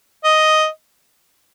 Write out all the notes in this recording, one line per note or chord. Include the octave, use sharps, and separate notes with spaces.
D#5